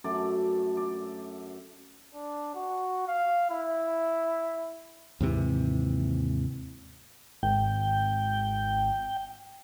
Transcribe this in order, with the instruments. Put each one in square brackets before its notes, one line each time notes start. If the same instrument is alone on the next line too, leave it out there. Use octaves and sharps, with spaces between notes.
[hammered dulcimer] F#2 A3 D5
D5
[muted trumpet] D4
F#4
F5
E4
[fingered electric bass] D#2 G#2 C3 E3
[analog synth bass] G#1 [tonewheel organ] G5